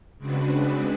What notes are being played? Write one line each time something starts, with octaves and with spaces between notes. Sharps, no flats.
C#3 G#3 C4 D4 F#4 B4